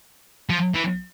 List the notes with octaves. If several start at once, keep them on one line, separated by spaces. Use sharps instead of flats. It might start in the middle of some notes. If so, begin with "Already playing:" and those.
F3
E3